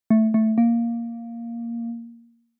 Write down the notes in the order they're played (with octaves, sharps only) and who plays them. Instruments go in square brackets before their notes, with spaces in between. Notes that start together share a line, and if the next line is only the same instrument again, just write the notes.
[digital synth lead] A3
A3
A#3